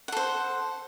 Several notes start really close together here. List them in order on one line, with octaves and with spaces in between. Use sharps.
F#5 A4 C5